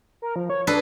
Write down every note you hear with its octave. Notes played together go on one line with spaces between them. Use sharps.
A#4
F3
C#5
D4 G#4 A4 B4